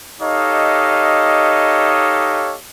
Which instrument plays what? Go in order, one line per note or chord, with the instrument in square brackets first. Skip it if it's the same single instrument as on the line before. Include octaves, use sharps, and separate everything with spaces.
[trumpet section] D#4 G4 A4 C#5 D#5 F5